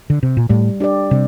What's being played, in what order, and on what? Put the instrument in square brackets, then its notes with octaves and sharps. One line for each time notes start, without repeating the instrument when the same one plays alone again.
[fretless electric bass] D3
C3
A#2
[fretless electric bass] A2 [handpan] G3
[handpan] D4 G4 D5
[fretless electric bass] C3 [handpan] G3